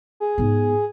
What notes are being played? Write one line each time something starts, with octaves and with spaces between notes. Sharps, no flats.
G#4
G#2 B3